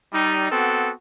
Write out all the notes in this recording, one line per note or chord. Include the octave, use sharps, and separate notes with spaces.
G3 D#4
B3 C4 F#4 A4